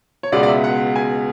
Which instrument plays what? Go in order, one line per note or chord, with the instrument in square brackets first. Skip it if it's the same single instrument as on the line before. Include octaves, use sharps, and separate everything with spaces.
[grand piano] C#5
C#2 B2 G#3 B3 D5
D5
E5
F#5
G#5